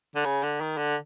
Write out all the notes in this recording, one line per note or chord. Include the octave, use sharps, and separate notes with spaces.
D3
C#3
D3
D#3
D3